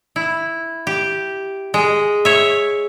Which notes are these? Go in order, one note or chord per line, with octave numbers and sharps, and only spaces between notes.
E4
G4
G#3
C#5 E5